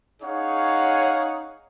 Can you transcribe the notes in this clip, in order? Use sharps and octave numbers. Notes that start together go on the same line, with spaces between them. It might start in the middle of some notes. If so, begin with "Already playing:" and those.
C#4 D#4 G#4 C#5 F5 F#5